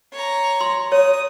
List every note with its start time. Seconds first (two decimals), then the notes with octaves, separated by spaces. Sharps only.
0.13 C#5 A#5
0.61 C6
0.92 C#5 D#6